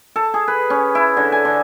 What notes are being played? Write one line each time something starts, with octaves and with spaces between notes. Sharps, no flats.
A4
G#4
B4
C#4
E4
D3
G#5
D3